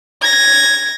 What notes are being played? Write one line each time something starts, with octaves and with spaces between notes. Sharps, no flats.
G#6 A#6